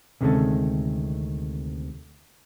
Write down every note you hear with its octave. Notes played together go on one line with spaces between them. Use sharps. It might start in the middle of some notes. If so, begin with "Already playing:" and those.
D2 C3 D#3 G#3 C#4 A4